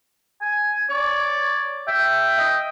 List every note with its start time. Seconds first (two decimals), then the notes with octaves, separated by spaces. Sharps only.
0.41 G#5
0.90 C#5 D5
1.88 E5 G5
2.39 D#5